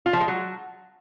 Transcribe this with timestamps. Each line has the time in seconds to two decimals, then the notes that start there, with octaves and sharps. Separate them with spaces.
0.06 F4
0.13 F3
0.20 G#3
0.28 F#3